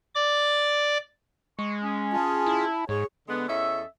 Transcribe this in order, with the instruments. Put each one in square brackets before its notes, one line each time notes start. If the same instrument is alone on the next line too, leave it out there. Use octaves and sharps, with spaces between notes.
[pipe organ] D5 D6
[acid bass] G#3 [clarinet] C#6
[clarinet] C#4
[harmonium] F4 G#4 [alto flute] A5
[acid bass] E4
[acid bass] G#2 [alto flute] G#4 [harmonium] C#5
[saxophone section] D3 G#3 B3
E2 C#4 A4 D#5 E5